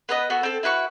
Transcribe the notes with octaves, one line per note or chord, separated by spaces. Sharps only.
B3 B4 D#5
B3 F#4 A4
C4 A4
E4 F#4 B4 C#6